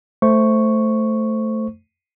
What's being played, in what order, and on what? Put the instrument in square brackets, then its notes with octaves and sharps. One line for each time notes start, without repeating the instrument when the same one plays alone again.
[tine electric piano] A3 C5 C#6